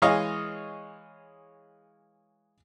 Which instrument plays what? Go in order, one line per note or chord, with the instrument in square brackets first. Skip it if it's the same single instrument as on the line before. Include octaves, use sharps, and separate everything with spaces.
[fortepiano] E3 G#3 G#4 C#5 D#5 F5